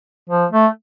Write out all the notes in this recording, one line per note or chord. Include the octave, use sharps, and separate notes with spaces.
F3
A3